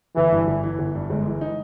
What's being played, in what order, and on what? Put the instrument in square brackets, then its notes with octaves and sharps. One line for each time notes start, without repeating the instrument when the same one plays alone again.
[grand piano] G1 [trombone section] E3
[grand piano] G2
G1
E3
G1
G2
[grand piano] G1 [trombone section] G#3
[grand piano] E3
D#4